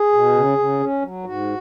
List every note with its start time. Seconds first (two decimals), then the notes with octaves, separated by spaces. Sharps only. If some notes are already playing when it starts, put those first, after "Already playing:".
Already playing: G#4
0.13 B2
0.35 C#3
0.58 C#3
0.80 C#4
1.02 F#3
1.24 G#2 F#4